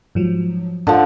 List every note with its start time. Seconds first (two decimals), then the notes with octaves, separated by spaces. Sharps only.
0.15 G#2 F3 F#3
0.87 G#2 D3 F3